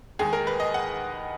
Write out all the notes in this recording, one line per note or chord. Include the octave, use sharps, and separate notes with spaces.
D#2 D#3 G#3 G#4
A#4
B4
D#5
F#5